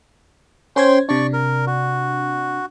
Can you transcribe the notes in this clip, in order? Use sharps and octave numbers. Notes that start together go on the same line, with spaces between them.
C#4 C5 G5 C6 G#6
C3 D4 D5 C#6
A#4
F#4